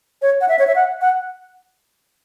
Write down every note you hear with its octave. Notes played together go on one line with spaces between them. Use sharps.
C#5
F#5
E5
C#5
E5
F#5
F#5